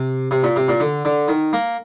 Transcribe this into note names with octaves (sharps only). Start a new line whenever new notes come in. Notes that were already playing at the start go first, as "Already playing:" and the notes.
Already playing: C3
C3
A#2
C3
A#2
D3
D3
D#3
A#3